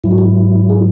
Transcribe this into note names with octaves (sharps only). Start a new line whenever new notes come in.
G#2 F#3 E4
F#4
E4
G#4